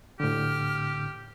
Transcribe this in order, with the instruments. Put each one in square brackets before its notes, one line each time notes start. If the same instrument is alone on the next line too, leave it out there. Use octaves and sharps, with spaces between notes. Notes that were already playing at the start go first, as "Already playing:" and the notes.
[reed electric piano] A2 D3 [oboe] G4 [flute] F6